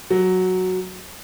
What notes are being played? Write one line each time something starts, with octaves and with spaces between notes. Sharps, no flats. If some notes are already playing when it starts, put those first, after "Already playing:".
F#3